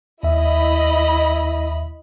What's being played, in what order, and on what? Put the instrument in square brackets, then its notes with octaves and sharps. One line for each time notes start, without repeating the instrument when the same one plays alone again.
[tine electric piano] D#2 E5 [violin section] E4 D#5 B5